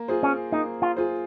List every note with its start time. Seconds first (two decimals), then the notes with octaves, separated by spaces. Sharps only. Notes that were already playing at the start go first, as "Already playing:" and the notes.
Already playing: A#3
0.08 F4 G#4 C5
0.23 C#4
0.52 A#3 D#4
0.82 F4
0.97 F4 G#4 C5